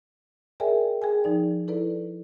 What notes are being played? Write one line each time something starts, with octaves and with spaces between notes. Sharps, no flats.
G#4 A#4 D5 E5 G5 G#5
G#4 G5 G#5
F3 D#4 D5
E4 A4 B4 D5